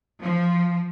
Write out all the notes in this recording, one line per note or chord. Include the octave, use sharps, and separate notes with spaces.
F3